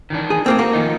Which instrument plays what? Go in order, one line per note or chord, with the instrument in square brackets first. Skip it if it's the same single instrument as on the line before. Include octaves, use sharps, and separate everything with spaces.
[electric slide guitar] D#3 E3 D4
[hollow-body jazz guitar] G#4
A2 A#3 C4
[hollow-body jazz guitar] A#3 A#4 F5 [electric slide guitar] F#4
[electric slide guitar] D#3 F3 D#4